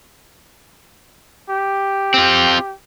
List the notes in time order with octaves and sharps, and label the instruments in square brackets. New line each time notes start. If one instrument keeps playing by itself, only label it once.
[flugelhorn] G4
[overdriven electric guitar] C4 F4